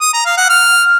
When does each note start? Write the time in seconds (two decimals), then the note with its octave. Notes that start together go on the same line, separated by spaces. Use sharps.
0.01 D#6
0.13 A#5
0.25 F5
0.37 F#5
0.49 F6